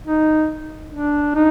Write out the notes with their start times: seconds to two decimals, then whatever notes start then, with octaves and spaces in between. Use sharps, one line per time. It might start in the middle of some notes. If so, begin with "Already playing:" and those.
0.07 D#4
0.92 D4
1.35 D#4